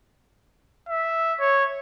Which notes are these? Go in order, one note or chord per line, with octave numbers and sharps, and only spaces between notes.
E5
C#5